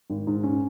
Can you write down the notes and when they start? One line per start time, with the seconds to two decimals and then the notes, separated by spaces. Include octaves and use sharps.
0.10 G#1
0.27 G#2
0.43 C#4